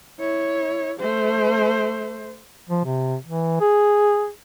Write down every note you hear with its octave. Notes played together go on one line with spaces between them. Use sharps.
E4 C#5
A3 C5
F3
C3
E3
G#4